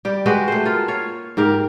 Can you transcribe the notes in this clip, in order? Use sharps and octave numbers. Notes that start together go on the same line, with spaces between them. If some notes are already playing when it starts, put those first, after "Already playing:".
G3 G4
G#3 F#4 G4 B4
A3 C5
A#3 F4
F4 C#5
G#2 G4 A#4